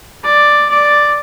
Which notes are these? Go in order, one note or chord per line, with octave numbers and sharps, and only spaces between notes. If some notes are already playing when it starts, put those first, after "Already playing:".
D5
D5